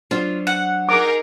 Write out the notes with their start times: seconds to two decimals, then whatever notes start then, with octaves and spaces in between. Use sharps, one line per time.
0.11 F#3 D4 F4 C5
0.47 F#5
0.89 D#4 G#4 A#4 D6